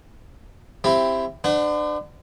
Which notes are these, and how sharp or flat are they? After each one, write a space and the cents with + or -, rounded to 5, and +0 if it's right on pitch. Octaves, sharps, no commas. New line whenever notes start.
C4 +0 E4 +15 G4 +10
D4 +30 C5 -45 F#5 +0